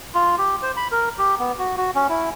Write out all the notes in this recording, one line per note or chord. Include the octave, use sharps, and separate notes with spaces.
F4
G4
C5
B5
A#4
G4
B3
F#4
F#4
C#4
E4